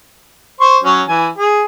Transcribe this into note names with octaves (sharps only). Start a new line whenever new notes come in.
C5 C6 C#6
F#3 C#4
E3 G#5
G#4